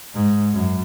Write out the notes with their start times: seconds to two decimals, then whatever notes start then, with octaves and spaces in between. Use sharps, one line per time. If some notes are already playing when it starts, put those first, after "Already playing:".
0.14 G#2
0.54 F#2